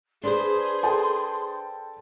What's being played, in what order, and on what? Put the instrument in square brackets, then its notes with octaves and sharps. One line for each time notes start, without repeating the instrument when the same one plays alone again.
[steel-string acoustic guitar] D4 B4 C5 [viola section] G#4 [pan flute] C6
[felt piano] A4 G5 A5